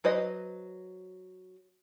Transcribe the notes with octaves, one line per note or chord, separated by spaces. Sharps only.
F#3 B4 C5 D#5